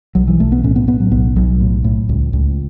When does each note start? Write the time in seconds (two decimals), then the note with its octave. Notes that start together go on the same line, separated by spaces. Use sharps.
0.15 B1 F#3
0.27 E3
0.40 B1 A3
0.52 B3
0.64 A2 C#4
0.76 B3
0.87 A2 B3
1.00 F#3
1.11 B1 B3
1.36 B1 F#3
1.60 A2
1.84 A2
2.09 C#2
2.33 C#2